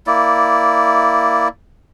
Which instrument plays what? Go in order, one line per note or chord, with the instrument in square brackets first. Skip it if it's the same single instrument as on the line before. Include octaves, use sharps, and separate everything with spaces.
[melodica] A#3 E4 D5